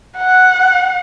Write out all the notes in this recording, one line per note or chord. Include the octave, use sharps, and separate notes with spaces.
F#5